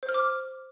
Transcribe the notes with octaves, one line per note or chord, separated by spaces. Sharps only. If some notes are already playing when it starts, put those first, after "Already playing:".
C5
F6
D6